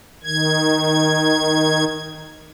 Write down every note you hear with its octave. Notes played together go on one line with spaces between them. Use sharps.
D#3 G#6